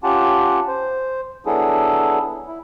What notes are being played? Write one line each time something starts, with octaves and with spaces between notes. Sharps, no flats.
C#4 F4 G4 F#5 A5
C5
F#3 B3 D4 E4 G#4 A4
E4